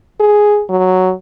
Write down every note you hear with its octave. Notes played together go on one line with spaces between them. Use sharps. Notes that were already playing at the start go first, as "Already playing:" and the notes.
G#4
F#3